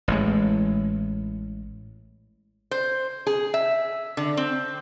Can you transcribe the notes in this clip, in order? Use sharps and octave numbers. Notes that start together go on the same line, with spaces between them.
A1 A2 G#3
C5
G#4
E5
D3
C4